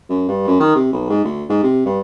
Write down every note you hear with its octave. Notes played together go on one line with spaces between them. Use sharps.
F#2
G2
F#2
D#3
C3
B1
G#2
D2
G#2
C3
G2